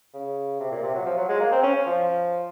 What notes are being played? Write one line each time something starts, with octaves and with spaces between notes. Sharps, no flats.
C#3
C3
A#2
C3
F#3
F3
F#3
G#3
A#3
C4
C#4
F3